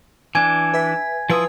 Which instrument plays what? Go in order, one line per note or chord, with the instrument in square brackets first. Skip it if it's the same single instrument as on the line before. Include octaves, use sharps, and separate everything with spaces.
[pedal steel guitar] E3 D4 [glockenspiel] G#5 G#6
[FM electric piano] B4 E5 B6
[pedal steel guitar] F3 E4 D#6 [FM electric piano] F4 B4 C6